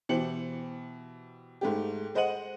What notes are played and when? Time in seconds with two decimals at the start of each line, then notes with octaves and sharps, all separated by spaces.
0.09 B2 E3 G4 C5 C#7 F#7
1.61 G#2 A3 G4
2.15 G#3 C5 D#5 F#5 D#7 F#7